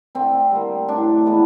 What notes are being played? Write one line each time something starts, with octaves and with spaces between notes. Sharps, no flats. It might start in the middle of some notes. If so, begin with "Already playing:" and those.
D3 C4
G3 A#3
A2 D4
E3 G#3 B3